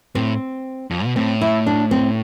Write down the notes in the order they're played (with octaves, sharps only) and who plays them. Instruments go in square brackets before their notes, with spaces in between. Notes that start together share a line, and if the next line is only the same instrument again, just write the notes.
[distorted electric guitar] A2 [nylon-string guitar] C4
[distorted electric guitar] F2
B2
[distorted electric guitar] A2 [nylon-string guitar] C4
[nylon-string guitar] E4
D4
C4